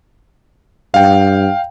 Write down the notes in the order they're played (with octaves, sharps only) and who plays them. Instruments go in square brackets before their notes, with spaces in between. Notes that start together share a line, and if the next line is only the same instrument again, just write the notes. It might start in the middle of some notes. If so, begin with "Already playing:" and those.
[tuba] G2 [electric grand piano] F5 G5